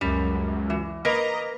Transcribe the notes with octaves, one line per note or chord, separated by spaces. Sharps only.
C#2 F#2 G3
E3
A#3 A#4 B4 D#5 A#5